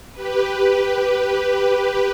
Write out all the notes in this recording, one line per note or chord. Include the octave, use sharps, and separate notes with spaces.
G4 B4